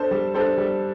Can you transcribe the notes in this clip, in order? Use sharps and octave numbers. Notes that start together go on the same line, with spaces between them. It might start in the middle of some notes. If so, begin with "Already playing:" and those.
Already playing: D4 A4 C5
G3
D4 A4 C5
G3